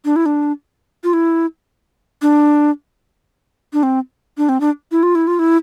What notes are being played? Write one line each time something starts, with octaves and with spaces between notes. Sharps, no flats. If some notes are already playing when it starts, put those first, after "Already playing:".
D4
E4
D4
F4
E4
D4
D4
C4
D4
C4
D4
E4
F4
E4
F4
E4